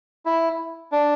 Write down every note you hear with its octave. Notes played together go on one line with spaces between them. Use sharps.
E4
D4